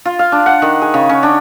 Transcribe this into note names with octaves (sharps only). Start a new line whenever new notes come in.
F4
F5
D4
F#5
D#3
G#4
C#3
C#4
D4